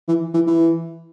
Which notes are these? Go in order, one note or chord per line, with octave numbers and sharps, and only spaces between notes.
E3
E3
E3